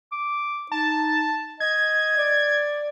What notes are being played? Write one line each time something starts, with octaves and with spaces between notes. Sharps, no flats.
D6
D#4 A5
D#5 G#6
D5